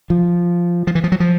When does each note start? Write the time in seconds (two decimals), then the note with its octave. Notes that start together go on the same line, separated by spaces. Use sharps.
0.10 F3
0.87 F3
0.95 E3
1.04 F3
1.12 F#3
1.20 F3